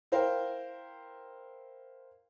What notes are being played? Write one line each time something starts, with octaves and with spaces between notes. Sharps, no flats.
E4 A#4 C5 F5 G5